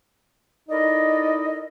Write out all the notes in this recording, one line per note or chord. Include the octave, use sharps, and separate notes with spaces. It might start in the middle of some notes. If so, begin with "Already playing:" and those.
D#4 E4 A4 A#4 D5 D#5